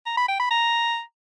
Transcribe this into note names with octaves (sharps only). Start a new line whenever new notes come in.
A#5
B5
G5
B5
A#5